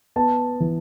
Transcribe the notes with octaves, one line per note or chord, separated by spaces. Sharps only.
B3 A5
E3